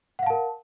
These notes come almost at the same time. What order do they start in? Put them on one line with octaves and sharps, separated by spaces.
F#5 F5 A5 A#4